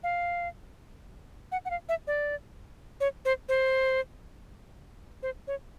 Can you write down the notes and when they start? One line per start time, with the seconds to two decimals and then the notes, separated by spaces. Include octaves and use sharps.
0.03 F5
1.52 F#5
1.65 F#5
1.70 F5
1.89 E5
2.07 D5
3.00 C#5
3.25 C5
3.49 C5
5.23 C5
5.47 C#5